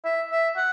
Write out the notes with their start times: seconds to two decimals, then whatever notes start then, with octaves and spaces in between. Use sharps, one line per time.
0.05 E5
0.31 E5
0.56 F#5